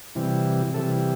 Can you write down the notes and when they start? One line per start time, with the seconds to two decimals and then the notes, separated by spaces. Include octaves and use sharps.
0.15 C3 E3 G3
0.74 C3 E3 G3 A4